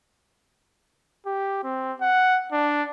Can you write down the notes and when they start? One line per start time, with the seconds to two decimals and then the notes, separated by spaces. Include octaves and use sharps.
1.26 G4
1.64 C4
2.01 F#5
2.52 D4